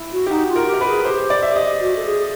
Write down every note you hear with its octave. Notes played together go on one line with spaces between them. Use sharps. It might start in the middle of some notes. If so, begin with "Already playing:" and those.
Already playing: E4
F#4
G4
D#4 F#4
F4
A#4
G4
A#4
B4
G#4
G4 C5
D5
E5
D#5
F#4
A4
G#4